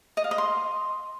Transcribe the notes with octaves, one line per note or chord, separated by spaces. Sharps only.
D#5
F5
D#5
C6